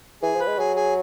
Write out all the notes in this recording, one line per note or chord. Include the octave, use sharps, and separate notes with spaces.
E3 G#4
F3
B4
G#3
F#3 G#4
G#4